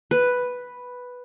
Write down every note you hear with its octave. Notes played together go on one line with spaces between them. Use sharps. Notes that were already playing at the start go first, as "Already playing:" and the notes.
B4